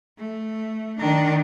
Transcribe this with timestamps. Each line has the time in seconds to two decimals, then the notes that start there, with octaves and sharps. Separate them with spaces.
0.18 A3
0.99 D#3 D4